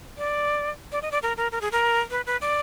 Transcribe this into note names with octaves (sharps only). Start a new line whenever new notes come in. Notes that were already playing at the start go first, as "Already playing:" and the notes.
D5
D5
D#5
D5
A#4
A#4
A#4
G#4
A#4
B4
B4
D5